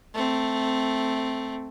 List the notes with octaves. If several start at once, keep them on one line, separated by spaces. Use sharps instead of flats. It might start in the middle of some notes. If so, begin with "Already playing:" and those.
A3 C4